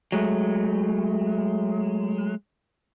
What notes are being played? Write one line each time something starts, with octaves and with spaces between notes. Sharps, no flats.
F#3 G#3 A3